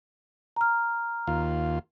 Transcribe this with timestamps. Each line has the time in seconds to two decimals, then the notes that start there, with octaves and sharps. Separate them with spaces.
0.56 A#5 F6
1.27 D#2 F4